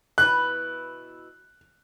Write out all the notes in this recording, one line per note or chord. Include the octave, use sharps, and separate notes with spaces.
B2 E4 B4 F#6